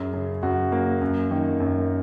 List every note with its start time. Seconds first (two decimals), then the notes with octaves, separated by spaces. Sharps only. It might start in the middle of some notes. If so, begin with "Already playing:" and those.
Already playing: F#2 G#4
0.14 C#3
0.43 F#2 F#4
0.72 C#3 A#3
1.02 F#2
1.31 D#3
1.60 F#2